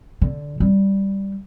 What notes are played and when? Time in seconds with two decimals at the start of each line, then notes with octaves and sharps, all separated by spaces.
0.22 D3
0.60 G3